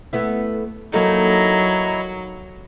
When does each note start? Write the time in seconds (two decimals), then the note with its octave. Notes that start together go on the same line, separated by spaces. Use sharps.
0.13 A3 B3 E4
0.93 F#3 A#3 D#4 E4 A4 D#5 A#5